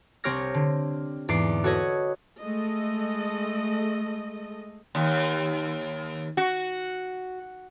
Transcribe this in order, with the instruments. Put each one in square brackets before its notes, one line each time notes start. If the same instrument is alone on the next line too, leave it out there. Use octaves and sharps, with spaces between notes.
[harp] C2 C4 G4 C#5 F6 A#6
D3
E2 G#2 D5 C7
F#4 A4 B4 C#5 D#5
[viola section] G#3 A3 A4 D#5
[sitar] D#2
F#4